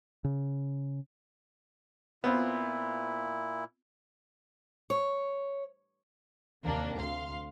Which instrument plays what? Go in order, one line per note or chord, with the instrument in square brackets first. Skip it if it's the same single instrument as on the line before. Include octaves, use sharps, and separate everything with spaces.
[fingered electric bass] C#3
[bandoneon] A#2 E4 [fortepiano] B3 C4 F4
[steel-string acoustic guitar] C#5
[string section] D#2 C3 A#3 D4
D2 F5 C6